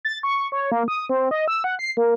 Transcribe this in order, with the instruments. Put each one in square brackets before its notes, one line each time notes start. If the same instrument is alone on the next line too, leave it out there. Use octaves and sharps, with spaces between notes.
[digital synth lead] A6
C#6
C#5
A#3
D#6
C4
D#5
E6
F#5
C7
A#3